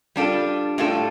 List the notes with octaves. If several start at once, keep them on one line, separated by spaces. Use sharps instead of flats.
G3 D4 F4 A4
A2 G3 F4 A4